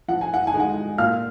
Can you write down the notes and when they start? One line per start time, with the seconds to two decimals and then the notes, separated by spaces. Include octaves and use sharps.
0.08 F3 F#5
0.21 G#5
0.34 F#5
0.47 G#5
0.54 G#3 D#4
0.60 F#5
0.98 A#2 F5 F6